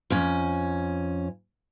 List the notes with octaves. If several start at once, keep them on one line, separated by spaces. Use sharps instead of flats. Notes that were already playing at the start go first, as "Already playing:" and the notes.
F2 C#4